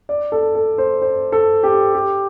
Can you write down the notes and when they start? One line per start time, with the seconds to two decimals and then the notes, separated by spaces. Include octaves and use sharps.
0.09 D5
0.32 A4
0.55 A4
0.78 C5
1.02 C5
1.32 A4
1.63 G4
1.94 G4